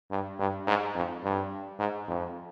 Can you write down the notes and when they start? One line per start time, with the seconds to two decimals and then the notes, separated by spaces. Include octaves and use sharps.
0.11 G2
0.39 G2
0.67 G#2
0.95 F2
1.24 G2
1.79 G#2
2.08 F2